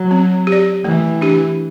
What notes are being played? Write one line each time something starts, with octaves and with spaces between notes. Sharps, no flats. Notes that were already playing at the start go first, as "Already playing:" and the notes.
Already playing: F#3
C4
G4
D5
E3 A3
D4 G4